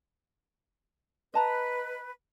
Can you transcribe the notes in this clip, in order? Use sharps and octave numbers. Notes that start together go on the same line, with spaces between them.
B4 D#5 A5 A#5